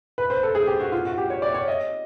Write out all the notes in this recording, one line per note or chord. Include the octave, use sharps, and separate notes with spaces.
B4
C5
A4
G#4
G4
F#4
F4
F#4
G4
C#5
D5
C#5
D#5